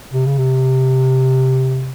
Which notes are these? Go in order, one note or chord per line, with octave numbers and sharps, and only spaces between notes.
C3
C#3
C3